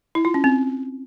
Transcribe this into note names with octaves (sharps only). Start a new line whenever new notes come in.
E4
F4
C#4
C4